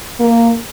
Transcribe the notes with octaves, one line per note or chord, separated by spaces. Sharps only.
A#3